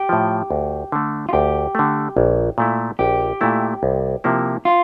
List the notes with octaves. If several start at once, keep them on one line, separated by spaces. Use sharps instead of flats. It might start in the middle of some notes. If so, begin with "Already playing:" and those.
Already playing: G4
A2 F3
D2
D3 A3
F4
D2 G4
D3 A3
A#1
A#2 A3 E4
A#1 G4
A#2 A3 E4
C2
C3 F3 A#3 E4
F4